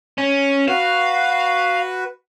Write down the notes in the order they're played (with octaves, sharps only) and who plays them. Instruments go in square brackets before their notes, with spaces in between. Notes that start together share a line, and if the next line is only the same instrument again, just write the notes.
[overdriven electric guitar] C#4
[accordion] F#4 B4 [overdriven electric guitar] F5